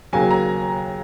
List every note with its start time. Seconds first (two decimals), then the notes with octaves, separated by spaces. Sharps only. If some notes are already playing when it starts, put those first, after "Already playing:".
0.13 D#2 C#3 F#3 A#3 G#5
0.31 A#5